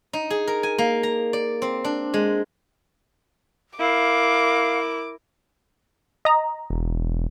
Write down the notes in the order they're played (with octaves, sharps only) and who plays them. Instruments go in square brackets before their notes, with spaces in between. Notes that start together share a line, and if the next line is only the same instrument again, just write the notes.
[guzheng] D#4
G#4
A#4
G#5
A#3
A#5
D5
C4
D4
G#3
[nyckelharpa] E4 A#4 [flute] F5 [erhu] D6
[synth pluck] D#5 A#5
[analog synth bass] E1